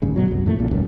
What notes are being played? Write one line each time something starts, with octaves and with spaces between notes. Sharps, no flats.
G#1 D2 G2 C#3
A1 G2 B2 F#3
F#1 C2 F#2
F2 A#2 E3 A3
A#1 A#2 C#3
D#1 C#2 F#2